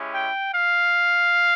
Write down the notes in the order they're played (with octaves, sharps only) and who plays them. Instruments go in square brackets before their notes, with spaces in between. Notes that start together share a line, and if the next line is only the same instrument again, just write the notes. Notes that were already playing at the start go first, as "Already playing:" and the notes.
Already playing: [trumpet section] G#3 C#4 E4 G4
G5
F5